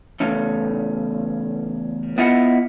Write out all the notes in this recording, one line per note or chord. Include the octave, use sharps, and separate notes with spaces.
E2 C#3 A3 C#4
B3 E4 F4 D#5 F#5